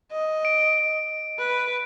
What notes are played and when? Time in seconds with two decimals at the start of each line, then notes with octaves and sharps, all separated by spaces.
0.12 D#5
0.45 D7
1.38 B4